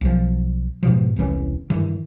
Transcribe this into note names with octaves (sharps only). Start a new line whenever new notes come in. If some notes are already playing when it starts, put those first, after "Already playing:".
B1 F3
G#2 B2 F3
E1 C2 E3 C#4
G2 D#3 E3